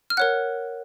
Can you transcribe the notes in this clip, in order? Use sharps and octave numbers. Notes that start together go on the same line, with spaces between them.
F6
A#4 C#5 F#5 F#6